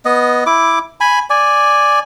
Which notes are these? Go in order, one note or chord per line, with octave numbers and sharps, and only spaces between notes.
B3 D#5
E4 D6
G#5 B5
D5 G#5